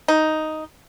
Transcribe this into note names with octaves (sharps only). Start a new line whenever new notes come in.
D#4